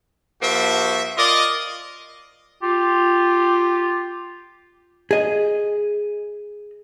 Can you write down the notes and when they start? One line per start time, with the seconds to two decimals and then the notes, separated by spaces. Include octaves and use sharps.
0.42 G2 F3 A#3 F#4 E5
1.17 F4 A#4 D5 D#5
2.63 F4 G4
5.11 G#4 D#5